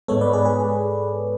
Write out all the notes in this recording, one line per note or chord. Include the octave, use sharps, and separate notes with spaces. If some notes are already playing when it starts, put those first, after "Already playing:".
G#2 G#3 B3 A4 C#5
B4 D5
G#4 B4
G#4 B4